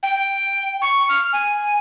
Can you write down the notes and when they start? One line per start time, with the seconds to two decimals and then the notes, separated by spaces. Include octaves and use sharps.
0.03 G5
0.82 C#6
1.09 F6
1.33 G#5